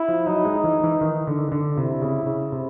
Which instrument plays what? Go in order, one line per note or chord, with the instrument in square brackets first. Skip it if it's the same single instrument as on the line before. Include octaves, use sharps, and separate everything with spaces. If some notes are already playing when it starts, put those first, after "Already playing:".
Already playing: [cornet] E4
[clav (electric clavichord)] F3
[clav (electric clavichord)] F#3 [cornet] D#4
[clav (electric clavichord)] G#3
E3
E3
D#3
D3
D3
[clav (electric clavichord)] C3 [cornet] E4
[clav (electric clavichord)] C#3
C#3
C3